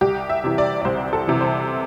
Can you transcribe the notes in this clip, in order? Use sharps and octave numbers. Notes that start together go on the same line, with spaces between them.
C2 G4
E5
C3 E3
D5
D5
C2 C5
A4
C3 E3
C5